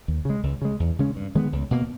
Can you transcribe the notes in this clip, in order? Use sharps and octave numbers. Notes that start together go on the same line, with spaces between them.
D#2
C#3 G#3
C#2
C#3 G#3
E2
C#3 G#3 C#4
G2
D#3 G#3 B3
C#2
B2 A#3